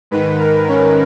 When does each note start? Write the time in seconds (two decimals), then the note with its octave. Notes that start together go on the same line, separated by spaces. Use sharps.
0.11 G#2 D#3 B4
0.40 A#4
0.68 C#4